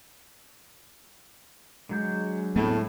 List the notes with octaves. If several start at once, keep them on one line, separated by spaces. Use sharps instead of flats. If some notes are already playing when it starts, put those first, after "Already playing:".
D3 F#3 G#3 G6
A2 A3 B3 C4